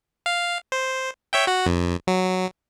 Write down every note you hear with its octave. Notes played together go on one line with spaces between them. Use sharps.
F5
C5
C#5 E5 G5
F#4 F#5
F2
F#3